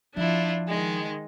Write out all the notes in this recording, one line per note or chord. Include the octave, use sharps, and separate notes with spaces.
F3 D4 E4 F4
D#3 G#3 D#5